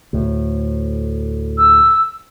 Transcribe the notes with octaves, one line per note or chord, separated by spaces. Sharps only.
D2 A2
E6